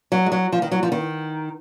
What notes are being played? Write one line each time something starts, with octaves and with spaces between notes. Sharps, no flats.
F#3
G#3
F#3
F3
D#3
F#3
F3
D#3